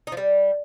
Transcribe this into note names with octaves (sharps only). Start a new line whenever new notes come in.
D#4
F3
G3